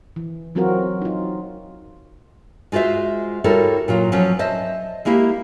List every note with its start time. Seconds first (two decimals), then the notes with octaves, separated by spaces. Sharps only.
0.16 E3
0.55 E3 F#3 C4 F4 F#4 A#4
1.02 D#4 F4
2.72 G#3 F4 F#4 C5 E5
3.44 G3 E4 F#4 A4 A#4 C#5
3.88 A#2 F#3 F4
4.12 F3 F#3 C#4
4.39 C5 D#5 E5 A5
5.05 G#3 A#3 E4 G4